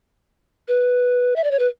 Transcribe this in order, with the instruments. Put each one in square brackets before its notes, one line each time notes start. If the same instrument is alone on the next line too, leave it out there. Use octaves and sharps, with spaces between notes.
[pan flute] B4
E5
D5
C#5
B4